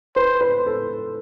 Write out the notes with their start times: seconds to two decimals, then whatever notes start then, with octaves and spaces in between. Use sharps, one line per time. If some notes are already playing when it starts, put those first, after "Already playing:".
0.16 B4 C5
0.41 B4
0.66 A4